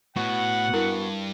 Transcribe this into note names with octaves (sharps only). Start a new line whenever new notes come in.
A2 B3 F#4 F#5
G2 E4 A#4